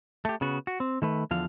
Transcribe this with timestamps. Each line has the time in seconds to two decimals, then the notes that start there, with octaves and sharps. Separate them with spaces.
0.25 A3 G4
0.41 C#3 B3 F#4
0.67 F#4
0.80 C4
1.02 D#3 A3 B4
1.31 E2 D3 F3 F5